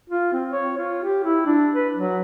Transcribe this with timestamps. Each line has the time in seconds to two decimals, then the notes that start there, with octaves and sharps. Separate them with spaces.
0.10 F4
0.33 C4
0.52 C#5
0.78 F4
1.03 G4
1.24 E4
1.46 D4
1.75 B4
1.96 F#3